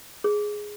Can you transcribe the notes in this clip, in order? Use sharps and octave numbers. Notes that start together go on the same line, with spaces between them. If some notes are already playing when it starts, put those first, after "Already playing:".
G#4